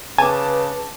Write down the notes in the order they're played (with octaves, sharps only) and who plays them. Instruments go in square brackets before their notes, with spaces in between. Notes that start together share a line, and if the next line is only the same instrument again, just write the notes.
[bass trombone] C#3 [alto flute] B4 [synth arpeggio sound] G#5 [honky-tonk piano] A5 D6